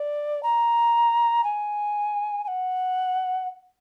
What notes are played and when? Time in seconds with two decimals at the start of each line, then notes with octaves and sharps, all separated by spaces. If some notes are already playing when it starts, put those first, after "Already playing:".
Already playing: D5
0.43 A#5
1.44 G#5
2.44 G#5
2.48 F#5